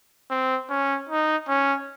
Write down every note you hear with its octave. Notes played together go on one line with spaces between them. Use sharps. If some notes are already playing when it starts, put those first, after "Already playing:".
C4
C#4
D#4
C#4